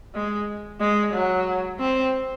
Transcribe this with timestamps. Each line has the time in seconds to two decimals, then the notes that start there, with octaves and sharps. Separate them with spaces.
0.14 G#3
0.80 G#3
1.13 F#3
1.79 C4